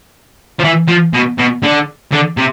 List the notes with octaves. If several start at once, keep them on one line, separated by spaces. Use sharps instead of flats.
F3
E3
F3
B2
B2
D3
D3
C3